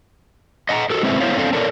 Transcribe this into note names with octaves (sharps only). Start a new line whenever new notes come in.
D#5 F#5 A5 A#5
F#4 A4 A#4
G#3 C4 E4 B4 C5 E5
B3 E4 C5 C#5 F5
C4 D4 A4 F5
A4 A#4 C#5 D5 A5